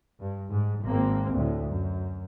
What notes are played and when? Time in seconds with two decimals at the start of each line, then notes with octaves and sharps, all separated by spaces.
0.20 G2
0.51 G#2
0.85 G#1 A#3 C4
1.33 D2 A2
1.68 F#2